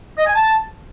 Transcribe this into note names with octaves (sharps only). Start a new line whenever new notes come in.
D#5
G#5
A5